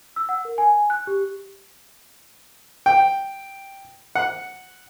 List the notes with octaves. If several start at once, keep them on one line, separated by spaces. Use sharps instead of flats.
E6
F#5
A#4
G#5
F#6
G4
G5
F#5